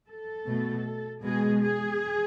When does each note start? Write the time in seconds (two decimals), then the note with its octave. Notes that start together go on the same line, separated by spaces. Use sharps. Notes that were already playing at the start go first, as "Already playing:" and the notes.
0.08 A4
0.46 B2 A3
1.23 B2 G#3 G#4
1.61 G#4